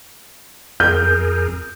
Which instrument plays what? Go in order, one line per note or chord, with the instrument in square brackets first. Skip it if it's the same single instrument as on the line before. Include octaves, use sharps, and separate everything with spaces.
[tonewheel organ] F2 G#4 A#4 [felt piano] G6